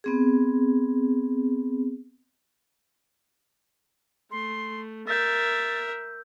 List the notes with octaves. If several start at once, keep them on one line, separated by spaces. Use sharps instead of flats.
B3 C4 G#4
A3 C6
A#4 E5 E6 G6 A6